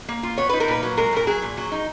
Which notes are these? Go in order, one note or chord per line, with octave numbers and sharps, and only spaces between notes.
A#3
F4
B3 C#5
D#4 B4
A#4
A#2 B4
F#3
G#3 A#4
A#2 A#4
F#3 G#4
A#2
F#3
D#4